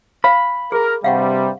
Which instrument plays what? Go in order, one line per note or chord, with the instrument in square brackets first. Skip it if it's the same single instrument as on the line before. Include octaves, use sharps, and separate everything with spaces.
[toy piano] B4 F5 [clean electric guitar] B5
[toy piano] G#4 [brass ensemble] A#4
[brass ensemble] G2 C3 G3 [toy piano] F5 F#5 C#6